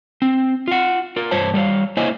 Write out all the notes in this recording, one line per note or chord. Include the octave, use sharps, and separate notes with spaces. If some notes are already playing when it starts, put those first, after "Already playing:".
C4
F4 F#5
F4 A#4
G2 C5 C#5 A5
G3 A3 C#5 F5
A#3 E4 C5 C#5 D#5 G#5